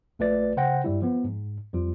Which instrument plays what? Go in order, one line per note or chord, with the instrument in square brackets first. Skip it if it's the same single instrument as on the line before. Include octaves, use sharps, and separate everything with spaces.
[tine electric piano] A#1 A3 F4 B4 D5 A6
C#3 C5 F#5 G5 A#6
G2 G3 E4
F3 B3
G#2
F2 F3 G3 F4